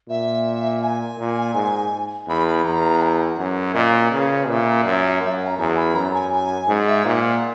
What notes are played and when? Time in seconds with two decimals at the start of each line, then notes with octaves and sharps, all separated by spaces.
0.08 A#2 E5
0.81 G#5
1.18 A#2
1.54 G#2
2.28 E2 B5
2.47 B5
2.64 E2 A#5
3.01 F#5
3.38 F#2
3.74 A#2 D#5
3.87 C#5
3.99 C#5
4.11 C#3 B4
4.24 C#5
4.35 B4
4.48 A#2 E5
4.85 F#2 E5
5.21 F#2 E5
5.33 F#5
5.46 A#5
5.58 E2 G#5
5.76 B5
5.95 F#2 A#5
6.13 G#5
6.32 G#5
6.68 G#2
6.87 E5
7.05 A#2 F#5